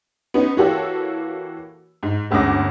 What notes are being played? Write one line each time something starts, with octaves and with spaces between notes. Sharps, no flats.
B3 C#4 D#4
E3 A#3 F#4 G4 A4 C#5
G#2
G1 D2 G#3 C#4 D6 A#6